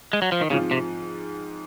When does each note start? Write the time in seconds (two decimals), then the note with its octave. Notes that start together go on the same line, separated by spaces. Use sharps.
0.13 G#3
0.22 F#3
0.32 F3
0.41 D#3
0.50 G#2 C#3 F3 C4 F4
0.71 C3